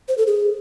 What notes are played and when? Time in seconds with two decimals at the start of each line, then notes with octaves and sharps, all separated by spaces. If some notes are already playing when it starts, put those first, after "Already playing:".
0.08 C5
0.18 A4
0.27 G#4